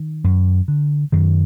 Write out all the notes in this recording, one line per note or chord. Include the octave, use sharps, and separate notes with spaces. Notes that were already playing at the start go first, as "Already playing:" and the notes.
Already playing: D#3
F#2
D3
F#2 D#3 F#3